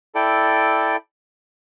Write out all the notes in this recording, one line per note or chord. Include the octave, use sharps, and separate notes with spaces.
E4 A4 D5 G5